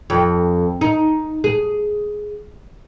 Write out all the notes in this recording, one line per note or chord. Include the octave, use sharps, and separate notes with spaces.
F2
D#4
G#4